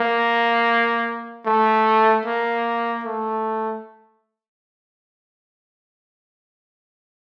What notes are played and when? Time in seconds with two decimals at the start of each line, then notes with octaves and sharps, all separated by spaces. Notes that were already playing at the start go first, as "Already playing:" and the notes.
Already playing: A#3
1.46 A3
2.26 A#3
3.04 A3